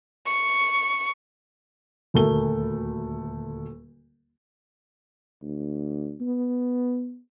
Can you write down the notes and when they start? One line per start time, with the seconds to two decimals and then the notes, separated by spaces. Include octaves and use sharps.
0.27 C#6
2.14 D#1 D2 A3 A#4 G7
5.42 D2
6.21 B3